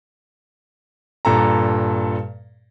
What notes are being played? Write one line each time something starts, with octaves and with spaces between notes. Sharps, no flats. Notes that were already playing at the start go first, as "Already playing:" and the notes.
G2 A#2 A4 A#5